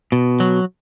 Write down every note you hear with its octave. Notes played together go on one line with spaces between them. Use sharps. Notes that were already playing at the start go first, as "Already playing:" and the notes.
B2
F#3